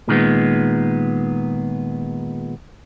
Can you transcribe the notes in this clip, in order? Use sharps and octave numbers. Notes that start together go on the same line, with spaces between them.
A#2 D#3 G#3 B3